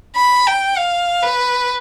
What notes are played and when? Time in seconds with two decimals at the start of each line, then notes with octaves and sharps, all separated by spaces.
0.16 B5
0.47 G5
0.77 F5
1.22 B4